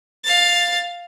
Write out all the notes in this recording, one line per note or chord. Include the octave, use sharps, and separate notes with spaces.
F5 A6